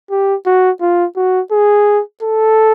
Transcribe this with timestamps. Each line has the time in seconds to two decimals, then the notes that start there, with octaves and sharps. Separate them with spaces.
0.11 G4
0.46 F#4
0.81 F4
1.16 F#4
1.52 G#4
2.23 A4